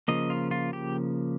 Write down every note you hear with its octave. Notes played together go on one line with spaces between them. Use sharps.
C#3 F3 A#3 D#5
F4
F4
G4